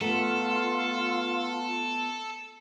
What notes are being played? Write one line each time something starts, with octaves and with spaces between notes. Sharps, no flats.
A3 B3 F4 A4 B4 F#5 A#5